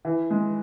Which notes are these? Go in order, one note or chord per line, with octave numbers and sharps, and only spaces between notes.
E3
G#3